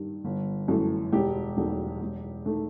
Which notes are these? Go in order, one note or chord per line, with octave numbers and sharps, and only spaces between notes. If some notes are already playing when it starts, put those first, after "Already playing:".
Already playing: G2 D#3
G1
F#2 E3 A3
E1 G4
E2 D#3 F#3 A3
E1
D#3 A3